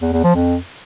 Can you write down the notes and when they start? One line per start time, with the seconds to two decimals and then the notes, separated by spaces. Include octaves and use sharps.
0.02 E2
0.13 E2
0.24 F3
0.35 F2